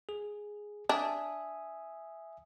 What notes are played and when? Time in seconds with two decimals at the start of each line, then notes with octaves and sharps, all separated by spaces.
0.09 G#4
0.89 D4 E5 G#5 D#6